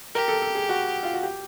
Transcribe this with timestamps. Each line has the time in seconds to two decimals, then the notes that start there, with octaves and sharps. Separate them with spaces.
0.15 G4 A#4
0.28 A4
0.42 A4
0.55 G#4
0.69 F#4
1.03 F4
1.14 F#4
1.23 G4